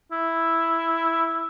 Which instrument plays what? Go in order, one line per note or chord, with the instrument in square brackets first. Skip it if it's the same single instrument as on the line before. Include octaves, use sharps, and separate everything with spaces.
[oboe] E4